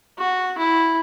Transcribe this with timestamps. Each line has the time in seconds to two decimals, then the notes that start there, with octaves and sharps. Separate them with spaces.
0.18 F#4
0.58 E4